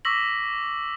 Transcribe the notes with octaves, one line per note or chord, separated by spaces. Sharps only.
C#6 D6 E6 A#6 B6 F#7